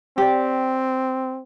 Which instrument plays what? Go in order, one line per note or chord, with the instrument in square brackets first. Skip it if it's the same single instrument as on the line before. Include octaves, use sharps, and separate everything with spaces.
[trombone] C4 [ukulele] G4 D5